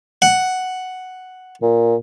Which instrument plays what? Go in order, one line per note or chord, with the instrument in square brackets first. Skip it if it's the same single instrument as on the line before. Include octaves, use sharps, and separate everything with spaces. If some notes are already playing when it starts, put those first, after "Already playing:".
[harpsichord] F#5
[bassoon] A#2